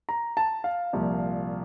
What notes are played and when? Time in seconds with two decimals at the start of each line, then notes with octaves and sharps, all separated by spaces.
0.09 A#5
0.37 A5
0.64 F5
0.93 C2 A#2 F3